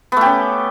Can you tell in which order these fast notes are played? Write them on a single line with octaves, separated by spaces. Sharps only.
B3 A3 G4 C#4